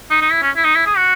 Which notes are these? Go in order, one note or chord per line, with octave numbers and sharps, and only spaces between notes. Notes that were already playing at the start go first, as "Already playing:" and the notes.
D#4
D#4
E4
C#4
E4
D#4
E4
G#4
F#4